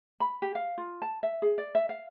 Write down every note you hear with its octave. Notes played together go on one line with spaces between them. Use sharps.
B5
G4
F5
F4
A5
E5
G#4
D5
E5
F5